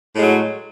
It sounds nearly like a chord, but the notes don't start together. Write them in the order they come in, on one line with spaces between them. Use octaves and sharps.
A2 G#3 F#3